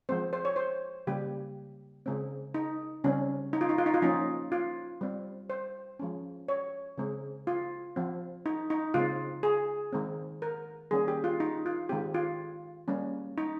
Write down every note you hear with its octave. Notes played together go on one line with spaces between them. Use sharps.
F3 G#3 C4 C5
C5
C#5
C5
C#3 G3 A#3 G4
C#3 G#3 C4
D#4
C#3 G3 C4 C#4
D#4
F4
D#4
F4
D#4
F4
F3 A#3 C#4 D#4
F4
G3 C4
C5
F3 G#3 C#4
C#5
C#3 G#3 C4
F4
F3 C4
D#4
D#4
C#3 G#3 C4 F4
G#4
D#3 G#3 C4
A#4
D#3 G3 A#3 C#4 G#4
G4
F4
D#4
F4
D#3 G#3 C4 G4
F4
G3 A#3 C#4
D#4